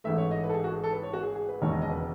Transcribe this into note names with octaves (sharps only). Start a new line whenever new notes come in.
A1 G#2 E3 A3 E5
C#5
D#5
B4
A4
G#4
F#4
G#4
A4
B4
C#5
F#4
G#4
G#4
B4
E1 D#2 C#3 G#3 C#5
D#5
D#5
B4